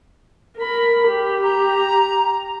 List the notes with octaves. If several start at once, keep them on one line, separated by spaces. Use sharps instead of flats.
A#4 B5
G4
A#5